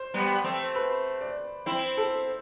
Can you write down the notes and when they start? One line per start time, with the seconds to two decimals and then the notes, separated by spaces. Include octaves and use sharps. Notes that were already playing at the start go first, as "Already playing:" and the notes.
Already playing: C5
0.14 G3 B3
0.44 A3 C4
0.75 B4
1.21 D5
1.66 C4 E4 C5
1.97 A4